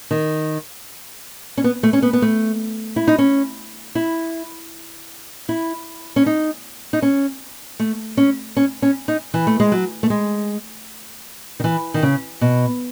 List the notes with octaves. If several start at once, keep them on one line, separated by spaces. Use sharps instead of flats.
D#3
C#4
B3
A3
C#4
B3
B3
A3
E4
D#4
C#4
E4
E4
C#4
D#4
D#4
C#4
A3
C#4
C#4
C#4
D#4
E3
A3
G#3
F#3
A3
G#3
D#3
E3
D#3
C#3
B2